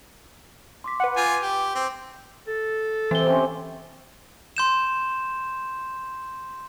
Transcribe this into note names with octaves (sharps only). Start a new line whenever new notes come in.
C6 D6 B6
B4 F#5
F4 G#5 D6 G6 D#7
G4
C4
A4
C3 E3 G7
C3 C4 C#4
C6 G6 E7